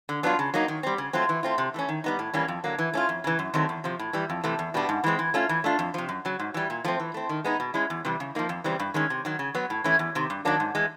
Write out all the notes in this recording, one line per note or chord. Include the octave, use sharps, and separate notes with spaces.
D3
F#3 B3 D4 F4
C#3
F#3 A#3 D#4
D#3
G3 C4
C#3
F#3 A3 C4 F4
E3
A3 C4 F4
C3
E3 A3 C#4
D#3
G3 B3 D#4
A2
E3 G3 A#3 C#4
F2
D3 F#3 A#3
E3
A3 C#4 F4
F2
C#3 E3
F#2
D#3 F#3 A3 C4
E2
C3 F3
A2
E3 G3
F2
C3 E3 A3
E2
B2 G3 B3 D4
G#2
E3 G#3 C4
E3
A3 C#4 F4
E3
A3 D4 F4
F2
C3 F3
F#2
C#3 F#3
G#2
E3 G3
A#2
F3 A3 C4
E3
A3 C4
D#3
G#3 B3 D#4
B2
G#3 C#4 E4
E2
C3 E3 G3
C#3
F3 A#3 D#4
F2
C#3 E3 G3 C4
G2
D#3 G#3 C#4
C3
D#3 F#3
C#3
F#3 B3
A2
E3 A3 C#4 E4
E2
C3 D#3
G2
D#3 F#3 A#3 D4
G#2
E3 G#3